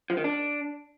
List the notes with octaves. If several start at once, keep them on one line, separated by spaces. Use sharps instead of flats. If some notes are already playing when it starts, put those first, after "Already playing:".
F3
D#3
D4